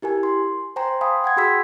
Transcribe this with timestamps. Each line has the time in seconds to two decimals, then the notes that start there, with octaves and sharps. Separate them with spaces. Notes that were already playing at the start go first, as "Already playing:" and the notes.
0.02 E4 G4 A#4 G#5
0.23 C6
0.76 C5 G5 G#5 A#5 C6
1.01 F5 G5 G#5 B5 C6 D#6
1.24 F#5 G5 G#6
1.37 F#4 G#4 B5 C6 E6 B6